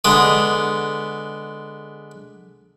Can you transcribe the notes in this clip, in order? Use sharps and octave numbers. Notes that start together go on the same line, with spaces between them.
D3 G#3 B3 D#6